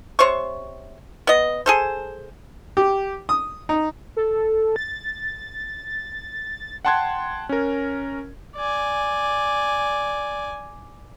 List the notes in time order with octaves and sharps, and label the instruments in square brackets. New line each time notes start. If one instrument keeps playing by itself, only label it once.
[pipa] C3 C5 C#5 C#6
B3 D#5
G#4 A4 C5
[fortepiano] G4
D#6
D#4
[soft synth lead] A4
A6
[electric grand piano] F#5 G5 A5 C6 F#6 G#6
C#4 A#4
[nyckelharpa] D5 G#5